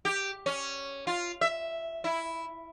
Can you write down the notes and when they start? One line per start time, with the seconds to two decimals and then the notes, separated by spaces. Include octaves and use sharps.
0.05 G4
0.46 C#4
1.07 F4
1.41 E5
2.04 E4